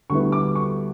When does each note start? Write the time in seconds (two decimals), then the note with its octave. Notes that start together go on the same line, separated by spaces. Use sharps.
0.10 D2 D3 G3 B3 E4 C#6
0.32 D6
0.55 C#6